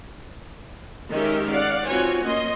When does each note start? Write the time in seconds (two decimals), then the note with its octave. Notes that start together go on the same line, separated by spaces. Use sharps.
1.11 D#3 G#3 C#4 G4 A#4 E5
1.50 D5 F5 F#5
1.87 C4 F4 F#4 B4 C#5 G#5
2.23 A#3 C#4 D#5 C6